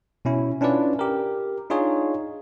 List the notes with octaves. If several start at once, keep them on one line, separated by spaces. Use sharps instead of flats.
B2 C#4 E4
C#4 D4 E4 F4 B4 D5
G4 A#4
D4 D#4 F4 G#4 C#5